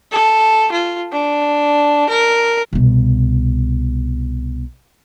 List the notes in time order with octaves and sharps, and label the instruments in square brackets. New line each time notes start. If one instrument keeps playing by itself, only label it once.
[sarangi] A4
F4
D4
A#4
[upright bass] C2 B2